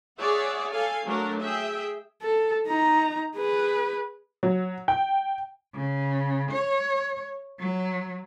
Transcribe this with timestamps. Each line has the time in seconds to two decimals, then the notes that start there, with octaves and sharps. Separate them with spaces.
0.19 G#4 C#5 D5 E5 F#5
0.70 A4 F5 G#5
1.05 F#3 A3 D4 A#4
1.40 G#4 E5 G5
2.22 A4
2.67 D#4 A#5
3.36 G#4 B4
4.43 F#3
4.88 G5
5.74 C#3
6.52 C#5
7.60 F#3